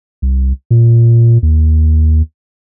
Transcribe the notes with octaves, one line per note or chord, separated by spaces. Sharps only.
C2
A#2
D#2